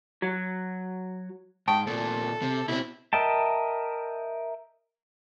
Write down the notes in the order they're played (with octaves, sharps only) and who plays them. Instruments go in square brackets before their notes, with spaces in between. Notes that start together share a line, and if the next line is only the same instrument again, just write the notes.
[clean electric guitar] F#3
[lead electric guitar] G#2 [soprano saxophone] G5 [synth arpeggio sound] A5 C#6 D#6
[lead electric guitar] D2 A#2 [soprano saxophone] A4
[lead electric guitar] C3
[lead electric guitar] B2 C4 [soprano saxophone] E4
[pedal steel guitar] A#4 D#5 E5 G5 A5